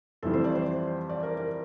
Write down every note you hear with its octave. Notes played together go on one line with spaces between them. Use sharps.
F2 E3 G3 A4
C5
D5
C5
C5
D5
A#4
A#4